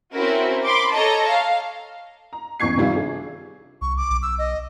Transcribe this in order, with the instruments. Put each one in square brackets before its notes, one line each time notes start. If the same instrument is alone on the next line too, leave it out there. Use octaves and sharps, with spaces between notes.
[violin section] C4 C#4 E4 F#4 A#4
B5 C6 D6
A4 C#5 D#5 A5 A#5
F5
[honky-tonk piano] A#5
A1 E2 C#6 G#6 C7
C3 D#3 G3 F4
D4 G#4
[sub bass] C2 [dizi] C#6
[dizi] D6
[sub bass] B1
[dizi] E6
D#5